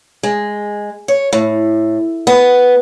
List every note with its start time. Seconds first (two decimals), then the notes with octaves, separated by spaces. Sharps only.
0.23 G#3
1.08 C#5
1.33 A2
2.27 B3